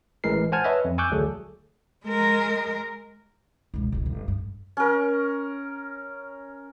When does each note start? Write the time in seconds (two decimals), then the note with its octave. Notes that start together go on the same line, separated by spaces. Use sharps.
0.24 A1 A2 E3 G#3 A#4 C7
0.52 C5 F#5 G#5 A5 F6 G#6
0.64 B4 C#5 D#5 E5
0.85 F2
0.98 G#5 C#6 D6 E6 F#6 G6
1.10 A1 D2 F#3 G#4 A4
2.05 G#3 A#4
3.74 E1 C#2
3.92 D#1 C#2
4.06 G1
4.28 G2
4.77 C#4 A#4